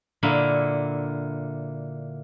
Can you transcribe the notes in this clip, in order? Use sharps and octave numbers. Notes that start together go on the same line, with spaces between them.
A#2 D3 A#3 E4